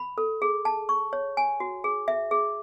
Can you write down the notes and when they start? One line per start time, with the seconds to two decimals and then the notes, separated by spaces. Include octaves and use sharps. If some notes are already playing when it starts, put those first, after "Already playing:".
Already playing: B5
0.18 A4
0.42 G#4
0.65 A5
0.89 C#6
1.13 C#5
1.37 G#5
1.60 F#4
1.84 G#4
2.08 E5
2.31 G#4